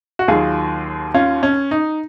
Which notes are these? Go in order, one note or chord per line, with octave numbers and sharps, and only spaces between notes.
F#4
D#2 D#3 F#3 F4 G#4
C#4 F4
C#4
D#4